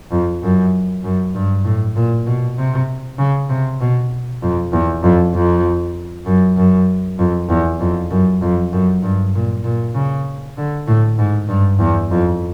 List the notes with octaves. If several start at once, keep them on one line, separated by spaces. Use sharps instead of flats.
F2
F#2
F#2
G2
A2
A#2
B2
C3
C#3
C3
B2
F2
E2
F2
F2
F#2
F#2
F2
E2
F2
F#2
F2
F#2
G2
A#2
A#2
C#3
D3
A2
G#2
G2
E2
F2